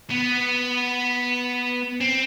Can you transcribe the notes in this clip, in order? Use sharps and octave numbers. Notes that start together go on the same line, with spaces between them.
B3
C4